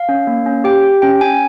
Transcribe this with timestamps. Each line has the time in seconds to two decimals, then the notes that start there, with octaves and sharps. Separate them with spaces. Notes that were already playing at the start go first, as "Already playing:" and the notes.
Already playing: F5
0.09 C#4
0.27 A#3
0.46 C#4
0.64 G4 G5
0.83 G4
1.02 C#4 G5
1.21 C#4 G#5